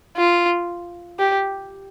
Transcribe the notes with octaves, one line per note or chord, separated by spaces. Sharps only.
F4
G4